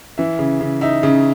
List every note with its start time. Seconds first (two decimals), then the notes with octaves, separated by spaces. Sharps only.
0.18 E3 E5
0.39 C#3
0.61 C#3
0.81 D#4 E5
1.03 C#3